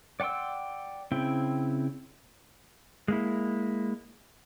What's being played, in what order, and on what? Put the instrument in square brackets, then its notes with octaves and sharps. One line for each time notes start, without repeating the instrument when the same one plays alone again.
[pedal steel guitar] D5 F#5 G5 C6 E6
C#3 C4 E4 G5
[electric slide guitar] G#3 A#3 E4